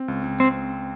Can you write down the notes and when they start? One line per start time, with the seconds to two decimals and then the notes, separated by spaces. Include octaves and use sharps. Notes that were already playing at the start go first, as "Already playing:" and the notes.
Already playing: C4
0.08 C#2
0.24 C#2
0.40 C4